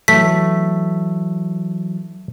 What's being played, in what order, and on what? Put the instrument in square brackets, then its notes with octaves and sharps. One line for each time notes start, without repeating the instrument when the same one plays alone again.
[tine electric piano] E3 F#3 [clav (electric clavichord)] A3 [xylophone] B6